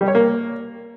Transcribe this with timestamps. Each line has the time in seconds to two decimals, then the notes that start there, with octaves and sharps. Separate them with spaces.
0.01 G3
0.08 C#5
0.15 A#3